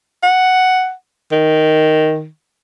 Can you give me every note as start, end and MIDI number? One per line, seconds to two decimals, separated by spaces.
0.23 0.92 78
1.32 2.27 51